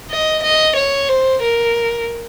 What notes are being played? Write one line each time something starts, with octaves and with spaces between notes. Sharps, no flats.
D#5
D#5
C#5
C5
A#4